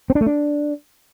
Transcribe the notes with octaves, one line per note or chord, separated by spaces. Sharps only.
C4
D4
A3
D4